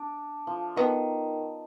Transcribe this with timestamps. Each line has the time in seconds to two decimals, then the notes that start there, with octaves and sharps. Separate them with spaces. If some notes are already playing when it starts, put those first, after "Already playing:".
Already playing: D4
0.47 F3
0.76 D#3 B3